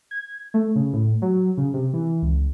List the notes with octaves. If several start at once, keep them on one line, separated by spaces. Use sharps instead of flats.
G#6
A3
C#3
A2
F#3
C#3
C3
E3
C#2